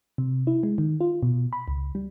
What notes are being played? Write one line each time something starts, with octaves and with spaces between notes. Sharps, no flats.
C3
E4
G#3
D#3
F4
B2
B5
C#2
G3